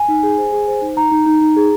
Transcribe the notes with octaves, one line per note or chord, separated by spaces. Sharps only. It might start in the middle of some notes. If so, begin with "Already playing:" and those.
Already playing: G#5
D#4
G#4
C5
G#4
C5
D#4
D#4 A#5
D#4
D#4
D#4
G#4